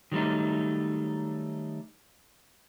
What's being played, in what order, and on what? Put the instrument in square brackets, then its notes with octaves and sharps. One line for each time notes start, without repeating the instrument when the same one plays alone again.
[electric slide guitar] D#3 F#3 G3 A3 D#4